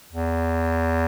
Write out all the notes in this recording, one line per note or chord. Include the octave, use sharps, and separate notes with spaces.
E2